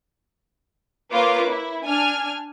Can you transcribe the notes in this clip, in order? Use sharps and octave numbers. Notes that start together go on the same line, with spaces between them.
A#3 F4 B4 C#5 D6
E4
D4 G#5 F6